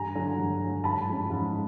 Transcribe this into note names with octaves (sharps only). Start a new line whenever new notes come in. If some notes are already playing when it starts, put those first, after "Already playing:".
Already playing: G2 G#5 A#5
D3 F#3
G2
D3 F#3
G#2 A5 B5
F3 G#3 C#4
G#2